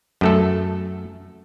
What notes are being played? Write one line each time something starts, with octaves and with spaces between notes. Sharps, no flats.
F#2 A3 A4